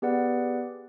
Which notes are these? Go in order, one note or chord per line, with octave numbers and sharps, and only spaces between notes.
B3 G4 G#4 B4 D5 F#5